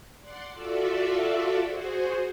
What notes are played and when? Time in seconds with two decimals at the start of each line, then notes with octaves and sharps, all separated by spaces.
0.20 D5 F#5 C6
0.51 F4 F#4 A4 D5 E5
1.64 F#4 G#4 C5